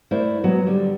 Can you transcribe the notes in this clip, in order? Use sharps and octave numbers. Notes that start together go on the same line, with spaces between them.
A3 E4 A#4 C5 D5
F#3 G#3 B3 F#4
D3 G3